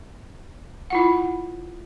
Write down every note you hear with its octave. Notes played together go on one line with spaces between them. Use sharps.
E4 F4 F#5